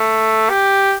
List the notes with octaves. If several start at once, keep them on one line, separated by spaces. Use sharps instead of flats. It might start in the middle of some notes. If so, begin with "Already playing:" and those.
Already playing: A3
G4